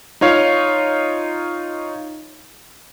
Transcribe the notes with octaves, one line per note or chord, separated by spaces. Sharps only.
D#4 F4 C#5 F5